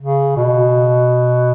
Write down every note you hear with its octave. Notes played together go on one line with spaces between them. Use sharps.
C#3
B2